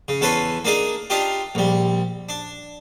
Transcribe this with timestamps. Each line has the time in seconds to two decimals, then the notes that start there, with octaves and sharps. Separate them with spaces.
0.08 C#3
0.21 E2 A4 B4 C#5 A5 C6
0.65 A#3 D4 D#4 G#4
1.10 D4 D#4 F4 G4
1.55 A#1 G3
2.29 D4